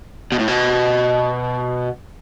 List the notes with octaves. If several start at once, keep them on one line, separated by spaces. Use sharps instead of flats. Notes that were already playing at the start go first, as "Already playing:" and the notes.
B2
A2
B2